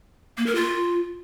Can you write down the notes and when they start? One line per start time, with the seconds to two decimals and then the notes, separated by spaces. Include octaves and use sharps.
0.38 A#3
0.46 A#4
0.55 F4